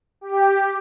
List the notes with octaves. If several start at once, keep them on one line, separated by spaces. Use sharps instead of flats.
G4